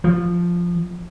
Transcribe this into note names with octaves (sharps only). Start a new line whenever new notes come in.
F3